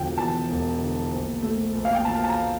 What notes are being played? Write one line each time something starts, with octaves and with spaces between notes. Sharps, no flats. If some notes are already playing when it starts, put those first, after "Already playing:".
Already playing: E1 D3 F3 G5
E2 A5
E1
D3
A#1
A3
A#1
F5
G5
A#2 A5
A5
A#5